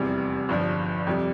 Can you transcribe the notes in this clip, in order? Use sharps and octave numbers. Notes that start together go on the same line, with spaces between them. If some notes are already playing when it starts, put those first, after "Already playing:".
Already playing: F1 E2 C3 G3
G1 G2 F3
F2 C3 G3